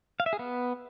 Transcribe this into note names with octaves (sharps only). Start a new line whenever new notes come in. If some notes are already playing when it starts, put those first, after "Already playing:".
F5
E5
G#4
B3